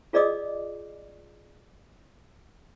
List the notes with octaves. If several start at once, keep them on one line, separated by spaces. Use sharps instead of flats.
F4 G#4 D5 D#5 D6 D#6